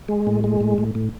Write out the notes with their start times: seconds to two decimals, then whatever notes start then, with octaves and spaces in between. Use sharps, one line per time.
0.08 G#3
0.27 A2
0.44 G#3
0.60 A2
0.78 A2
0.95 A2